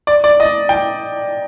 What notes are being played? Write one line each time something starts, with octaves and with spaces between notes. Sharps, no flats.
D5
D5
D#5
G5